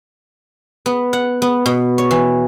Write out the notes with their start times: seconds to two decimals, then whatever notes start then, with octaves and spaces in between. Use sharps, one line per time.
0.86 B3
1.13 F#5
1.42 B3
1.66 B2
1.98 C#5
2.11 E3